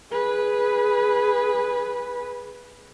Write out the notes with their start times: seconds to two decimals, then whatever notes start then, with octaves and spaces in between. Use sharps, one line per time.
0.11 G#4 B4